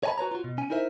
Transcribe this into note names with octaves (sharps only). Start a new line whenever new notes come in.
C#5 D#5 G#5 A5 B5
F#4 B4 C#5 A#5
F4 F#4
B2
C#4 G#5
D#4 E4 A#4 C5 E5